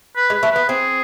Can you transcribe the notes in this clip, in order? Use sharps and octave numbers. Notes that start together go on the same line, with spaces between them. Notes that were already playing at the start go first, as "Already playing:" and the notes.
B4
G#3
B4
A3
B3 B4
C4 G#4